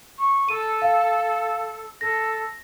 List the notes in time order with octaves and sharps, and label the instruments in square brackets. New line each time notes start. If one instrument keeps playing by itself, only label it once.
[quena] C#6
[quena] A4 [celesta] D#7
[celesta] F5
[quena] A4 [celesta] A#6